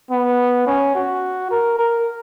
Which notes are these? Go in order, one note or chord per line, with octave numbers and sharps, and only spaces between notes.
B3
C#4
F#4
A#4
A#4